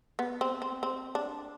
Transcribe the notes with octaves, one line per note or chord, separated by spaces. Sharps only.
B3
C4
C4
C4
D4